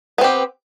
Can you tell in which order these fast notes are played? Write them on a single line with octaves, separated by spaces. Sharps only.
B3 C4 G4